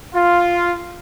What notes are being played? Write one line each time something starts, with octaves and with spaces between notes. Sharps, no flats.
F4